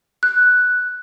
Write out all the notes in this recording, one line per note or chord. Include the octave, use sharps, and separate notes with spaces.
F#6